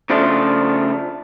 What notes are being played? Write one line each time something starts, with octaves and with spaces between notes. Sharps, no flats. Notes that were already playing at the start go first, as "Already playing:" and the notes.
C#3 F3 A3 D4 F4